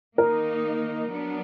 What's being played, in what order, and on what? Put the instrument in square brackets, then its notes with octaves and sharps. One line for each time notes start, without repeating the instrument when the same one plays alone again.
[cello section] D#3 A#3 D#4 [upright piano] A#4
[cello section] F#3 B3 D4